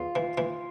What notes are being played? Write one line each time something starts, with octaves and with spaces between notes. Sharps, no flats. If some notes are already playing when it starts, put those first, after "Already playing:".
Already playing: E2 F4
E3
E3